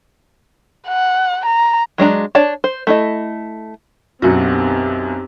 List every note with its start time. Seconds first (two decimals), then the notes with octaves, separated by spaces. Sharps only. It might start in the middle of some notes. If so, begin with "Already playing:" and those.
0.87 F#5
1.46 A#5
1.98 F#3 G#3 D4 A#5
2.35 D4 C#5 D5 A5
2.64 C5
2.87 A3 E4 D#5
4.22 B1 F#2 B2 C4 F#4 G4